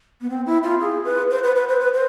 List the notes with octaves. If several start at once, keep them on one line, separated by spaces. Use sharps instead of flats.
B3
C4
E4
F4
G#4
B4
C5
B4
B4
C5
B4
C5